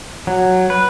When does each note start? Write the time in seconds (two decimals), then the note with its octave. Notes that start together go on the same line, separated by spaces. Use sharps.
0.27 F#3
0.70 B4